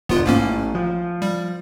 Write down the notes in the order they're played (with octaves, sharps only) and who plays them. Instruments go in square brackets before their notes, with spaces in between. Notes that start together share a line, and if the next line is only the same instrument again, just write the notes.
[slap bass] E1 D3 [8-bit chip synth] B3 F4
[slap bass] A1 [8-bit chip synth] G#2 A#3 C#4
[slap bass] F3
[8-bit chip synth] G3